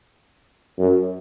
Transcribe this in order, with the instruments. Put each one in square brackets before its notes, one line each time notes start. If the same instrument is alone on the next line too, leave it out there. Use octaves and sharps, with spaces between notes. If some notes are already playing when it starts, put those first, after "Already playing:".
[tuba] F#2